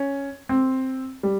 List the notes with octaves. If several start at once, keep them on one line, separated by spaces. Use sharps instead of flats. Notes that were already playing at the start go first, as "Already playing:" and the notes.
Already playing: C#4
C4
G3